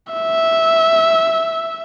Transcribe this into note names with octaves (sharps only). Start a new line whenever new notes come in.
E5